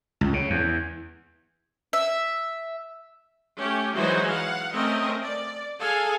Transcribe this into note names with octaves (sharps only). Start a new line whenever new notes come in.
C#2
C#3
E2
E5
A3 C#4 G4
E3 F#3 G#3 D#4 F#4 C5
F5 F#5
A3 C4 C#4 A#4 D#5
D5
G#4 A4 F5 G#5